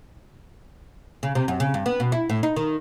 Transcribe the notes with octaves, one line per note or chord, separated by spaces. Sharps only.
C#3
C3
F#2
C#3
G2
B3
B2
E4
A2
D#4
D#3